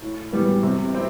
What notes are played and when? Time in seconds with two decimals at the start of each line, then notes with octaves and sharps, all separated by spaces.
0.02 A2
0.33 E3 G3 B3
0.63 C3
0.94 C4 E4